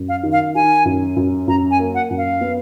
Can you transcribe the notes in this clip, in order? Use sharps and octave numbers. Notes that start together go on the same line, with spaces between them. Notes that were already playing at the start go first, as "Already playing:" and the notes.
Already playing: F#2
F5
D#3
F5
D#3 G#5
F#2
F#2
F#2 A#5
G#5
A#3
F#5
F#2
F5
B3